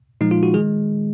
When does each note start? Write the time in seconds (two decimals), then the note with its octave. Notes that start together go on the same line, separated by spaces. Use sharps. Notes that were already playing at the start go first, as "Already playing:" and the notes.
0.21 A#2 F3 G#3 D#4
0.31 F4
0.43 F#4
0.54 D#3 G#3 G#4